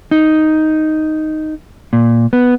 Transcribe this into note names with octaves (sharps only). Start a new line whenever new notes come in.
D#4
A#2
B3